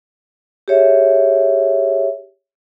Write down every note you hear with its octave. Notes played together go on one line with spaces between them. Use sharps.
G4 G#4 C#5 E5